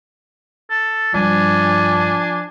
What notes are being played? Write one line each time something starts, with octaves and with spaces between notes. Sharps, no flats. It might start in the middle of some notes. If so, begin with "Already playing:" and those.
A4
G2 F3 D4 G#5